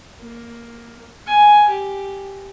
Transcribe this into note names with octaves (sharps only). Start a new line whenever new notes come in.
A#3
G#5
G4